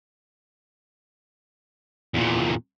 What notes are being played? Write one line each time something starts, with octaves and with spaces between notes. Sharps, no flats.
E2 A#2